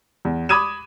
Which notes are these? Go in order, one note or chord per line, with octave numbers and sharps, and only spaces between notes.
E2
B5 D6 D#6 G#6 D#7 E7